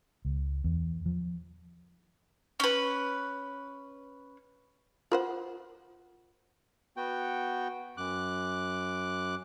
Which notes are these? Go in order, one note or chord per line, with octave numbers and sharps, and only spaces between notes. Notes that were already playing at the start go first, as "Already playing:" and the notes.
C#2
E2
F3
C#4 B4
F4 A#4 C5 F#5
B3 F#4 G5
F#2 D6 F#6